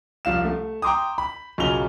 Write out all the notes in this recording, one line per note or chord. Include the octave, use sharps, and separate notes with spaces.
C2 F3 F5 E7
A3
G5 A#5 C6 D6 D#6
B5
B1 F#2 C#3 F4 F7 G7